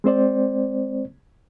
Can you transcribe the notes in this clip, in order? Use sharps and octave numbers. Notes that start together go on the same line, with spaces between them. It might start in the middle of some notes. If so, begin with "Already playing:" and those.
G#3 C4 C5 D5